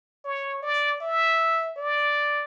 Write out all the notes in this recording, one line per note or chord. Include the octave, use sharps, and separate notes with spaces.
C#5
D5
E5
D5